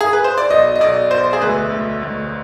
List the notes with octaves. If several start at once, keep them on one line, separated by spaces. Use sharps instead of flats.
G#4
B4
C5
D5
B1 D#5
D#5
B1 D5
B1 C5
G#4
D2 B4
D2
D2